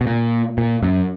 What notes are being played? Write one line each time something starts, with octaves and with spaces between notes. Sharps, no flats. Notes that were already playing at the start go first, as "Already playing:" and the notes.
B2
A#2
A#2
F#2